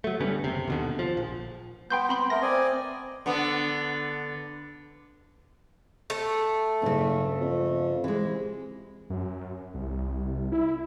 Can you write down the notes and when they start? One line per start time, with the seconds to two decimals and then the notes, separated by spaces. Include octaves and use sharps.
0.04 F#3 A3
0.20 D3 G3 B3 C#4
0.44 F#1 C3
0.68 D#2 B2 D3
0.99 F3
1.17 A#1
1.90 B3 G5 C6 G6
2.09 C4 B5 C6
2.30 A3 B3 A#4 A#6
2.42 C4 D5 D#5 G#5
3.26 D3 B3
6.10 A3
6.82 F#1 G2 C#3
7.41 F2
8.04 C3 E3 G#3
9.10 F#2
9.74 C2
10.52 E4